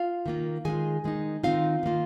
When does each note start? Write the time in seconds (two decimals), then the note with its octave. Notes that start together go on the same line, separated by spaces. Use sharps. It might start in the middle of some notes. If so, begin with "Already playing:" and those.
Already playing: F4 F5
0.26 D#3 A#3 F4
0.65 D#3 G#3 F4 G#4 G#5
1.04 D#3 G#3 D#4
1.43 D#3 C4 D#4 F4 F5
1.83 D#3 A#3 F4